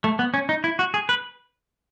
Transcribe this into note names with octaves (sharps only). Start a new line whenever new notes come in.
A3
B3
C#4
D#4
E4
F#4
G#4
B4